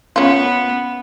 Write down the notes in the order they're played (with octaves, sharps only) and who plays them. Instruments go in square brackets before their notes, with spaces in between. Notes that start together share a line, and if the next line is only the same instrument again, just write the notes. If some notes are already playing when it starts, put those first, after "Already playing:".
[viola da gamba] B3 [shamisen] C#4 F4